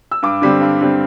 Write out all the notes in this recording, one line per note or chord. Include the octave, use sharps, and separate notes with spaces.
E6
G2 D6
D3 G3 C4
G2
D3 G3 C4